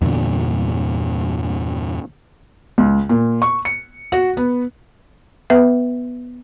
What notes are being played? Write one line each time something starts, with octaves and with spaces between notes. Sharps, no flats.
E2 G2 A#2 D3
C#2
A#2
C#6
C#7
F#4
B3
B3 B4 E5